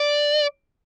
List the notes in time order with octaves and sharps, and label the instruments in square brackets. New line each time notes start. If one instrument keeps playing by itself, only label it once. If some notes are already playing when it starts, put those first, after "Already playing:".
Already playing: [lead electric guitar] D5